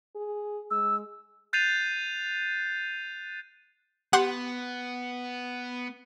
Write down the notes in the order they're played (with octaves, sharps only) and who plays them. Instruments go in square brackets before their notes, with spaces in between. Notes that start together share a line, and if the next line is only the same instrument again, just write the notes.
[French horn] G#4
[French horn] G#3 [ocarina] E6
[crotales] F#6 G6 A6 C7 D#7 F7
[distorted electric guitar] B3 [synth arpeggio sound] G4 C6 [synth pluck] F#5